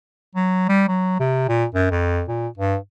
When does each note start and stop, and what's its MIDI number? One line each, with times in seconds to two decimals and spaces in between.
0.35 0.65 54
0.69 0.84 55
0.88 1.19 54
1.20 1.44 48
1.49 1.65 46
1.75 1.87 42
1.91 2.23 41
2.28 2.48 46
2.58 2.76 43